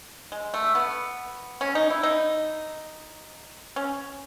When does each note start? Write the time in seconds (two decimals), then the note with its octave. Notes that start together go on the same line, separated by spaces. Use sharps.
0.32 G#3
0.54 A3
0.75 B3
1.61 C#4
1.75 D#4
1.90 E4
2.03 D#4
3.76 C#4